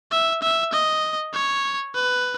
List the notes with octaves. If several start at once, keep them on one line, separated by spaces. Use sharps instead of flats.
E5
E5
D#5
C#5
B4